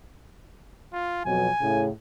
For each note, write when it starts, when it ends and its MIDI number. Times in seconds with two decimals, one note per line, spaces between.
0.93 1.22 65
1.25 1.48 41
1.25 1.48 47
1.25 1.48 54
1.25 1.86 80
1.61 1.89 45
1.61 1.89 49